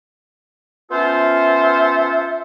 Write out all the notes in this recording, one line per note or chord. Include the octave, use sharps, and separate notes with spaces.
B3 C#4 F4 A4 C5 E5